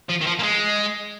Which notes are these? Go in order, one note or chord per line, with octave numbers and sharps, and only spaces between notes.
F3
D#3
F3
A#3
G#3